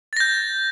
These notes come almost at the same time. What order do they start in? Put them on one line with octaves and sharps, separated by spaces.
A6 A#6 G6